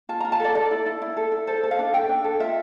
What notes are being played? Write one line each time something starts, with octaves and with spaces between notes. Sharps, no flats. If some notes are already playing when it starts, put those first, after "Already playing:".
F4 A5
F4 A#5
A5
A4 D5
A4 D5
E4
E4
E4
A4
E4
A4 C5
A4
F5
D4
A4 G5
D4
A4
F4 E5